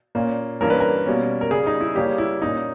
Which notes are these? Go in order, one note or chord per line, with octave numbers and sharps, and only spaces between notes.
A#2 A#3 C#4
G2 E3 A#3 C#4 A#4
B4
A#4
B2 G3 A#3 C#4
A#4
C#3 G3 C#4 G#4
D#4
E4
C#3 G3 A#3 C#4 G4
E4
A#2 A#3 C#4 D#4